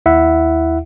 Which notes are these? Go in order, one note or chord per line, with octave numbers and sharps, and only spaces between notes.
D#2 E4 E5 F#5